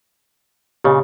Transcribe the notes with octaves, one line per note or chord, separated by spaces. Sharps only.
A#2 C#3 G4 C#5 D#5